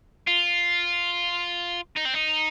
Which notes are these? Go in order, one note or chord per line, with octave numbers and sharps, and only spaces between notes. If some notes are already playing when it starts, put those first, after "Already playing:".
F4
D#4
C4
D#4